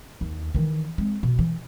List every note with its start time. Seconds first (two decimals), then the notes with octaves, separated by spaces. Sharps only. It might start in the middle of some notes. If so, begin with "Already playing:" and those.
0.21 D#2
0.55 D#3 E3
0.98 G#3 C4
1.23 B2
1.39 E3